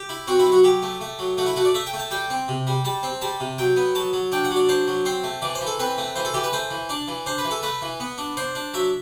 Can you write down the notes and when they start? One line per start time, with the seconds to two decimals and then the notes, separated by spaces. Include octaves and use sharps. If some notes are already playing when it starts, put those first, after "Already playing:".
Already playing: G4
0.09 E4
0.27 C4 F#4
0.39 E4
0.46 F#3
0.52 F#4
0.64 F#3 G4
0.83 A3
1.01 A3
1.19 F#3
1.37 A3 F#4
1.47 E4
1.56 A3 F#4
1.65 D5
1.74 A3 E5
1.87 G5
1.93 A3
1.99 A5
2.11 G3 G5
2.30 C4
2.48 C3
2.67 G3
2.84 G3 A5
3.03 C4
3.21 G3 A5
3.40 C3
3.58 F#3 G5
3.76 B3
3.95 F#3 A5
4.13 F#3
4.32 D4 G5
4.44 F#5
4.51 F#3
4.56 D5
4.69 D4 C5
4.87 F#3
5.05 C4 C5
5.24 A3
5.42 E3 D5
5.55 C5
5.61 E3
5.67 A4
5.79 C4 B4
5.98 A3
6.16 E3 C5
6.25 A4
6.34 E3 G4
6.43 B4
6.53 A3 C5
6.71 E3
6.89 D4 D5
7.08 E3
7.26 D4 C5
7.38 B4
7.45 E3
7.51 A4
7.63 A3 B4
7.82 E3
8.00 B3
8.18 D4
8.37 D4 C5
8.55 D4
8.74 F#3 E5